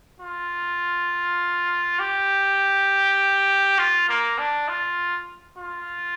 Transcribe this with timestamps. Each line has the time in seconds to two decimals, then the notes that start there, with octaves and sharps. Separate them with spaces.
0.20 F4
1.99 G4
3.78 F4
4.09 A#3
4.38 D4
4.68 F4
5.58 F4